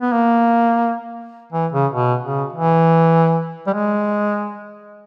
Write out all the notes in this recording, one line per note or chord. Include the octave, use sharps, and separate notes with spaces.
B3
A#3
E3
C#3
B2
C#3
E3
G3
G#3